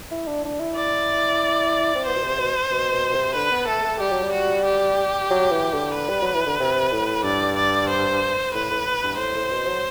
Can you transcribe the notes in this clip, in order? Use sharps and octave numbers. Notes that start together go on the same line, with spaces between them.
E4
D4
D4
E4
D5
C4
B3 C5
B2
C3
B2
B2
B2
B2
C3
D3 B4
B3
A3 A4
A3
G3 G4
F#3
G3
F#4
G4
F#3
E3
D3
B4
G3
F#3
E3
D3
C3
A2
G2 D5
D5
C5
A2 B4
A2
G2
A2 C5
A2
B2
F#3